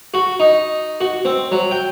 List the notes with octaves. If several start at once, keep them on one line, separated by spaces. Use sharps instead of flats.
F#4
D#4
F#4
C4
F#3
G5